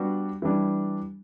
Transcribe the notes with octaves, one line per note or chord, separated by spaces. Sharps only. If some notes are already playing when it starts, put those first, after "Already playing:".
Already playing: G3 B3 D4 F#4
E3 G3 D4